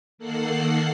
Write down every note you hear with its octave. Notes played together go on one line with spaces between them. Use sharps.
D#3 A#3 A4 F#5 F#6 C7